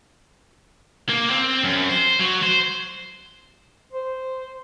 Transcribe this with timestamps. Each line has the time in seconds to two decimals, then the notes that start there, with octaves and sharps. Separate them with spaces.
1.10 A#3
1.31 C4
1.64 F#2
1.89 C5
2.20 F#3
2.43 C5
3.93 C5